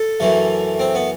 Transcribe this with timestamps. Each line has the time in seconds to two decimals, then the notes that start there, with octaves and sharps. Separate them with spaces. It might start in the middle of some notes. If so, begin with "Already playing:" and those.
Already playing: A4
0.20 F#2 E3 A3
0.79 C4
0.95 B3